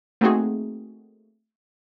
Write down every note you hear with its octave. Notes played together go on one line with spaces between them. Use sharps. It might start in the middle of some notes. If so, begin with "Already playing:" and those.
A3 A#3 C4 D#4 F#4 G#4